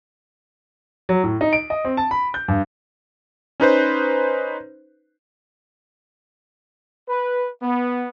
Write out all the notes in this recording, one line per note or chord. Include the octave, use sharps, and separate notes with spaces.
F#3
A2
D#4
D7
D#5
C4
A5
B5
G6
G2
C#4 D#4 B4 C5
B4
B3